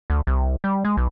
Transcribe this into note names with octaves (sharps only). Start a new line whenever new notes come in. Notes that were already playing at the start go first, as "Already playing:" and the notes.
D2
C2
G3
G#3
B1